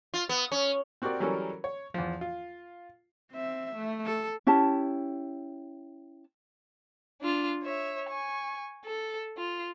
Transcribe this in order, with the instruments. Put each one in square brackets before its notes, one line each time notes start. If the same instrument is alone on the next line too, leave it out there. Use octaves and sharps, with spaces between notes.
[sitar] F4
B3
C#4
[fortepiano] C4 F#4 G4 A#4 D5
E3 F#3 G3 C#4 A4 A#4
C#5
E2 F3
F4
[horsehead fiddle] C4 E5
A3
A4
[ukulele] C#4 E4 G4 A5
[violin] D4 F4
C#5 E5
G#5 C#6
A4
F4